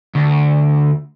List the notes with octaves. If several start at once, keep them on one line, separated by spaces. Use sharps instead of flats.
D2